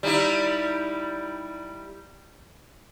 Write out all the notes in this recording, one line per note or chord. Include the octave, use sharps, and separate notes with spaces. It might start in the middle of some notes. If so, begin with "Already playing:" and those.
G3 D#4 E4